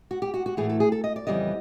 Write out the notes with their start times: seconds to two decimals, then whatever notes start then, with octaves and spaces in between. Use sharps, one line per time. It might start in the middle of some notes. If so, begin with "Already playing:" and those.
0.11 F#4
0.22 G4
0.34 F#4
0.46 F#4
0.57 A2 E3 A3 G#4
0.70 A4
0.80 G#4
0.92 A4
1.04 D#5
1.16 D5
1.27 F2 C#3 E3 G3 B3 D#5